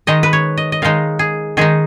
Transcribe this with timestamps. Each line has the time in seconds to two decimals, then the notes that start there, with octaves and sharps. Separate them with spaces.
0.07 D#3 G#3 D#4 D#5
0.23 B4
0.33 C#5
0.57 D#5
0.72 D#5
0.82 D#3 G#3 D#4 F5
1.19 G#4
1.57 D#3 G#3 D#4 G#4